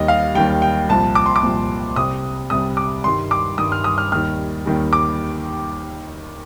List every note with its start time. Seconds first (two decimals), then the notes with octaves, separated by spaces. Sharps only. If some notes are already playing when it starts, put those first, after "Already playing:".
Already playing: D#2 D#3 G3 D#5
0.08 F5
0.35 D#2 D#3 G3 G5
0.62 G5
0.89 C2 A#2 F3 A5
1.15 D6
1.26 C6
1.36 D6
1.43 C2 A#2 F3
1.96 C2 C3 G3 D#6
2.50 C2 C3 G3 D#6
2.77 D6
3.04 G2 D#3 G3 C6
3.31 D6
3.58 G2 D#3 G3 D#6
3.72 F6
3.84 D#6
3.98 F6
4.12 D#2 D#3 G3 F6
4.66 D#2 D#3 G3
4.93 D6